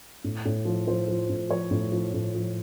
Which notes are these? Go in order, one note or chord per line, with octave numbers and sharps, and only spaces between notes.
A2
A2
F3
F3 C5
F3
A2
F3 C#5
A2
F3
A2
F3